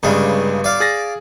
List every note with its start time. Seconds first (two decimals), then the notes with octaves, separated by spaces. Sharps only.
0.03 G1 G2 C#3 G3 G#3
0.64 D5 F5 D6
0.80 G#4 A6 A#6